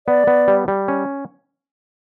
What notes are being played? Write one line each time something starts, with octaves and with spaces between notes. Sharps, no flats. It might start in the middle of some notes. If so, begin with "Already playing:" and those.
B3 D5
B3
G3
G3
C#4